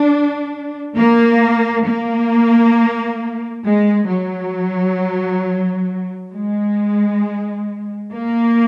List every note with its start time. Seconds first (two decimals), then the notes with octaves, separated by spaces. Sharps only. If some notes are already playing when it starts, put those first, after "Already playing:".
Already playing: D4
0.96 A#3
1.86 A#3
3.64 G#3
4.08 F#3
6.32 G#3
8.11 A#3